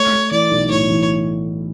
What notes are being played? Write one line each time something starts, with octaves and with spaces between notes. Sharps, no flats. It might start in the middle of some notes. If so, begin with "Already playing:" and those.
Already playing: A3 C#5
A3
E3 D5
B1
A2 C#5
E3